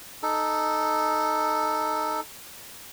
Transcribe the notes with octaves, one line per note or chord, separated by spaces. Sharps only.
D#4 A4